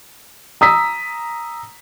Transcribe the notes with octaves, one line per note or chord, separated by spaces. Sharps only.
A#5 D#6 E6 B6